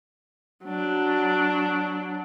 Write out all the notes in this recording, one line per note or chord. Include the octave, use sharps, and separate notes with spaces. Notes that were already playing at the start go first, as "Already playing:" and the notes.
F#3 D4